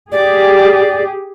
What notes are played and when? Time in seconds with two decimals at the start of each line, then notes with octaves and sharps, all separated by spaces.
0.11 G4 G#4 D5